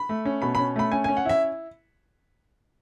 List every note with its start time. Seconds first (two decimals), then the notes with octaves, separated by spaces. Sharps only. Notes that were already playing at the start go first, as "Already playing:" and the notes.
Already playing: B5
0.09 A3
0.25 C#4
0.42 B2 B5
0.55 C#4 B5
0.76 A3 B5
0.92 C#4 G#5
1.04 C#4 G#5
1.17 F#5
1.25 E4 E5